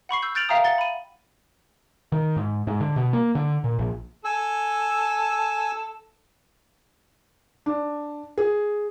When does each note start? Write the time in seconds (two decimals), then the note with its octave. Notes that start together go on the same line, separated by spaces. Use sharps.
0.09 F#5 B5 C#6 C7
0.22 E6 G6
0.35 F6 G6 A6 D7 F7 F#7
0.49 E5 F5 G5 A#5 D#6
0.64 F#5 A6 G7
0.78 B5 D#7
2.12 D#3
2.37 G#2
2.67 G#2
2.81 D3
2.96 B2
3.13 A#3
3.35 D3
3.64 A#2
3.79 A#1
4.25 A4 G#5 E6
7.66 D4
8.38 G#4